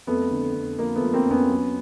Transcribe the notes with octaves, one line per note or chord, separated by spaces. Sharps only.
F2 A3 B3
D3
F2
F3 A#3
A3 B3
F3
A#3 C4
F2
B3 C#4
F#3